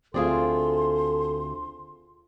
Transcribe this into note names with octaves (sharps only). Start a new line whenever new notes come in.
D2 C4 F4 G#4 A4 D5 C6